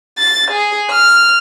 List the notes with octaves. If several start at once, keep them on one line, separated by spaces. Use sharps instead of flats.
A6
G#4
F6